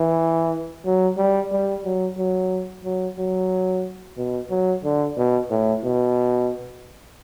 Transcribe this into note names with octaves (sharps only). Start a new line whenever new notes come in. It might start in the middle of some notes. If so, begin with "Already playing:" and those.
Already playing: E3
F#3
G3
G3
F#3
F#3
F#3
F#3
B2
F#3
D3
B2
A2
B2